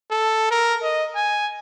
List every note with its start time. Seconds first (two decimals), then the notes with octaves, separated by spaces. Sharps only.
0.11 A4
0.51 A#4
0.83 D#5
1.16 G#5